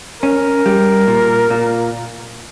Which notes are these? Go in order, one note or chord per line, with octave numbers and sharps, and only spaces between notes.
C#4 A#4
G3
A#2
A#2